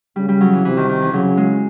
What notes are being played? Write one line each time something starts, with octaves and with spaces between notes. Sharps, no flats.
C#3 G3
G3
F#3
E3
C3 E3
D#3
D#3
E3
C#3 F#3
G#3